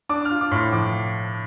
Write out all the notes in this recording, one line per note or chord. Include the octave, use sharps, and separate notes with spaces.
D4 D6
F6
F4
D6
A2 C6
F3 D6